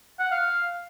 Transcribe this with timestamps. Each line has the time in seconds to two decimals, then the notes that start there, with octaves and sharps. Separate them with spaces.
0.19 F#5
0.31 F5